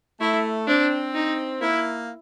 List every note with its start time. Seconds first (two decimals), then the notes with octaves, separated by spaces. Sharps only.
0.21 A3 E4
0.68 C4 D4
1.15 D#4
1.61 A#3 E4